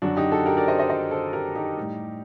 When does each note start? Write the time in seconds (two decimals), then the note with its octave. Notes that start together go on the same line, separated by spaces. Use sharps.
0.02 F#2 D3 F#3 D4 F#4
0.17 D#4 G4
0.32 F#4 A4
0.46 G4 A#4
0.57 A#4 D5
0.68 C5 D#5
0.79 C5 D#5
0.89 C5 D#5
1.11 A4 C5
1.33 G4 A#4
1.56 D#4 G4
1.77 A2 G3